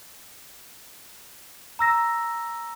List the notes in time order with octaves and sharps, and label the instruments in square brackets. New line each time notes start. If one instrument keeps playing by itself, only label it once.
[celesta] A#5 E6 A#6